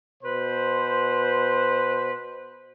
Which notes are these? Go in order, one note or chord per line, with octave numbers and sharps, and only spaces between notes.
B2 B4 C5